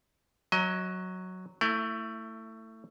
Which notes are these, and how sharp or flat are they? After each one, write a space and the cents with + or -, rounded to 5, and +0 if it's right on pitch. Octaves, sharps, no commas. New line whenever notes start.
F#3 +0 D#5 +25
A3 +20 E4 +0